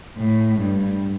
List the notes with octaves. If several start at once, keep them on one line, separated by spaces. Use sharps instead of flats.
A2
G2